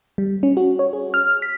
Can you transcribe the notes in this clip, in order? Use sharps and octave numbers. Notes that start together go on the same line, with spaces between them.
G3
C#4
F#4
C#5
G#4
F6
B6